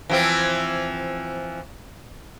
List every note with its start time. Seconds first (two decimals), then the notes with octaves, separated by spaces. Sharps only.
0.10 E3 F3 C4